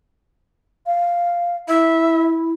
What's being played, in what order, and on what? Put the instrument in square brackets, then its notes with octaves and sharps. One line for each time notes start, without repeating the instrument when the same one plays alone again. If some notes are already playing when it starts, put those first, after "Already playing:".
[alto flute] F5
[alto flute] E4 [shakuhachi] E5